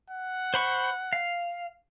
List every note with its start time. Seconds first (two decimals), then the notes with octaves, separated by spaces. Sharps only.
0.10 F#5
0.54 C5 B5 C#6
1.13 F5